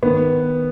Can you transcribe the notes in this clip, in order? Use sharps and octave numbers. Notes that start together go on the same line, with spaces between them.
D#3 B3